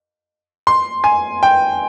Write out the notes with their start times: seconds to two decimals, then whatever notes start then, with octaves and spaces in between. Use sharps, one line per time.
0.67 C6
1.04 G#5
1.43 G5